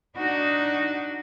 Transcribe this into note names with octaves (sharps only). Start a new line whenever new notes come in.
D4 D#4 F#4